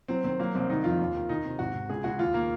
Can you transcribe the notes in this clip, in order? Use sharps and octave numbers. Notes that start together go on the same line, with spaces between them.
F#3 C4
D#3 C4
F#3 A#3
C2 C4
D#3 D#4
F2 F4
D#2
D#3
D#3 D#4
C3
G#1 F#4
G#1
C#2 G#4
C#2 F#4
D#2 F4
D#3 A#3